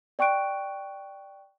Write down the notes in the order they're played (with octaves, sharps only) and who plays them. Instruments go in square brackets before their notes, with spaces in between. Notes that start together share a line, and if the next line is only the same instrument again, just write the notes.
[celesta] D5 G5 C#6 F#6 D7